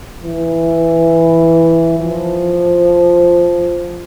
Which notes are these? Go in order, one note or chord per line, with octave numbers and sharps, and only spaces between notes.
E3
F3